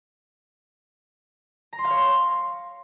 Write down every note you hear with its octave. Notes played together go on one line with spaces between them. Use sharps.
A#5
C6
F5
C#5
C6